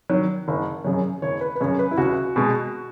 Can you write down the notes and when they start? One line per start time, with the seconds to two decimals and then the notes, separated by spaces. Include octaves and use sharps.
0.10 D#3 F#3
0.48 F#1
0.84 F#2 C#3 F#3
1.22 F#1 C#5
1.41 B4
1.56 B4
1.60 F#2 C#3 F#3 C#5
1.79 B4
1.91 E4
1.97 C#2 F#4
2.36 B2 G#3